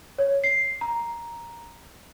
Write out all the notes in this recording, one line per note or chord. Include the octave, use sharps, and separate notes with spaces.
C#5
C7
A#5